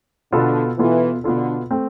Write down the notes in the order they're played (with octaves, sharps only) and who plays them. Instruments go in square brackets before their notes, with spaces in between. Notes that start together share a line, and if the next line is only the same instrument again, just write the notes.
[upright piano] B2 B3 F4 A4 [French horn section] D3
[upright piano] B2 B3 F4 A4 [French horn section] E3
[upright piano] B2 B3 F4 A4 [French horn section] D3
[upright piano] A3 C4